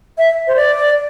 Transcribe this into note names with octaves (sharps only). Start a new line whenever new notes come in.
E5
C5
D5